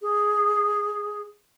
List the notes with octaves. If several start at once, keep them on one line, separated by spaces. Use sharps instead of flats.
G#4